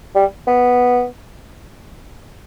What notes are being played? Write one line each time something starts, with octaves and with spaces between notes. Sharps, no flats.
G3
B3